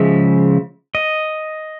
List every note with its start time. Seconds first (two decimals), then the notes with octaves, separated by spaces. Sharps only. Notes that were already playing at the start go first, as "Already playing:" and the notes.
Already playing: C#3 F3 G#3 E5
0.95 D#5